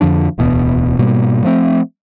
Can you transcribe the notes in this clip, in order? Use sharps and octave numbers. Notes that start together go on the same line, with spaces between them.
F2 D3 F3 D4
D1 E2 B2 B3
G#2 B2 G3 A#3
F3 A3 C4